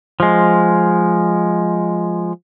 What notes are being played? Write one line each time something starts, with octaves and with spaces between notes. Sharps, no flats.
F3 G#3